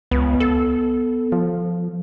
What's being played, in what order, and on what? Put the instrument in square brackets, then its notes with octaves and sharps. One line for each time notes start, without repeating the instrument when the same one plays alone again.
[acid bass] C#2 [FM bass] B3
[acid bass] A4
[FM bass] F3